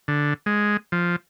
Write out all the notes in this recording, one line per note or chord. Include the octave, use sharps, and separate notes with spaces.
D3
G#3
F3